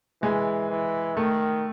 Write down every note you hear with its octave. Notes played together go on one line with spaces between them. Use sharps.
E3 G#3
E3
D#3 A3